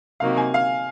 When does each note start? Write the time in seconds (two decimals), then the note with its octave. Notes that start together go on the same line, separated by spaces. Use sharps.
0.20 C3 D#3 F#3 A#3 F5
0.37 G#5
0.54 F5